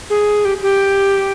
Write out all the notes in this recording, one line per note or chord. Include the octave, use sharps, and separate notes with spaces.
G#4
G4
G4